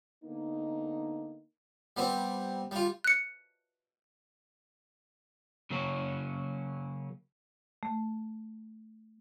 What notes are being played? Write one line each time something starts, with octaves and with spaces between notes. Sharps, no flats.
D3 A#3 B3 D#4
G3 B3 C4
G3 F4
F#6 C#7
C#3 F#3 A#3 C#4 F#4
A3